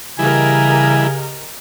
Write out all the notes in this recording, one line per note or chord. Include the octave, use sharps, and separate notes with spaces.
C#3 E3 G3 E4 G4 A#4 D#5 G#5